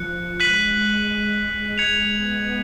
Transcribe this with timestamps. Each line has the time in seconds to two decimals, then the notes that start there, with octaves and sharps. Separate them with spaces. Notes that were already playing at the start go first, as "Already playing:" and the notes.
Already playing: F3 F#6 C#7
0.40 G#3 F#6 B6 D#7 F#7
1.09 G#3
1.78 G#3 G#6 C#7 F7
2.12 B3